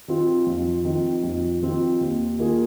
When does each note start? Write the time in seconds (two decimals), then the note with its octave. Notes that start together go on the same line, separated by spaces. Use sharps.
0.08 D#3 C4 F4
0.47 F2
0.85 D#3 C4 F4
1.23 F2
1.62 D#3 C4 F4
2.01 D#2
2.39 D#3 A#3 F4 G#4